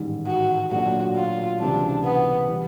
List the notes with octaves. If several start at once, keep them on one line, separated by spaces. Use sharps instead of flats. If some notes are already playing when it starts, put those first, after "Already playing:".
Already playing: A1 G#2 D#3 G3
F#4
A#2 F#3 A3 D4 F#4
F4
C#2 C3 E3 G3 C4 D4
B3
E3 G3